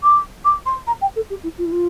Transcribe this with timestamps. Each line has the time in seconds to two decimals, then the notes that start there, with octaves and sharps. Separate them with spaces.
0.03 D6
0.45 D6
0.66 C6
0.87 A#5
1.01 G5
1.16 A4
1.30 G4
1.43 E4
1.58 F4
1.65 E4
1.72 F4